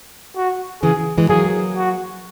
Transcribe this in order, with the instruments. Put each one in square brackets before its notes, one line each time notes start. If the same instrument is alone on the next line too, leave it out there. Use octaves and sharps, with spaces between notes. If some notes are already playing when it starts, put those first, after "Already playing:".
[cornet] F#4
[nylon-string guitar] C#3 E3 [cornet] G#4
[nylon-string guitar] E3 G#3
[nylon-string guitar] F#3 A#3 [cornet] G#4
[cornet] F#4